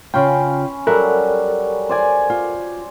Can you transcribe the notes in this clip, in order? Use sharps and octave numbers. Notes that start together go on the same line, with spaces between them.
C#3 C#4 F4 G5 B5 C6
F#3 G3 A4 A#4 E5 F#6
C5 D5 G#5
F4